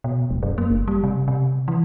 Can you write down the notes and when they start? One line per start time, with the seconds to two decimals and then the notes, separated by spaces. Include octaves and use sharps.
0.04 B2
0.30 D#1
0.43 F#2
0.58 A#3
0.70 F#1
0.88 G3
1.04 C3
1.28 C3
1.68 E3